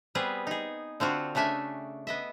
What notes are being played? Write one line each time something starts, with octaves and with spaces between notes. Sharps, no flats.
G3 B3 C4 G#4 B4
D#4 G#4
D3 C4 F4 F#4
C#3 A3 D4 E5 G#5
B3 D#5 E5